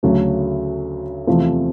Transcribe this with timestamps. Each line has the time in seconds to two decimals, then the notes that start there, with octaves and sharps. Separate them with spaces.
0.03 D2 C#3 F#3 A3
1.27 E2 C3 F3 A3 C4